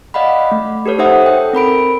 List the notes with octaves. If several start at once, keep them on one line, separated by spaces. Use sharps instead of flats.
D5 D#5 F5 F#5 B5
A3
G4 A4 B4 C#5
D#4 C5 E5 F#5 D#6
A4 G5
C4 A#4 B5 D7